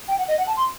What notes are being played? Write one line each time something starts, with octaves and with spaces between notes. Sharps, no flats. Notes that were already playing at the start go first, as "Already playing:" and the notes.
G5
F#5
D#5
F#5
A5
C6